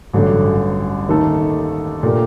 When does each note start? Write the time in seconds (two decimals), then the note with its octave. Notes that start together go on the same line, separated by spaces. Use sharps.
0.13 A1 G2 D3 F#3 A3
1.09 D#2 D#3 A3 D#4 A4
2.03 A#2 A3 D4 G4 A#4